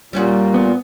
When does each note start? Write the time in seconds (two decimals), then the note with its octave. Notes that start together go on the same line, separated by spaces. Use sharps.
0.13 A#2 G3 C#4 F#4
0.54 B3